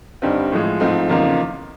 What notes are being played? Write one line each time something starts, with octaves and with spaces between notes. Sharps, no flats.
G2 D3 G3 C4 D#4
A2 F3 G#3
G#2 F3 A3 C4 D#4
E2 C#3 F3 A#3 D#4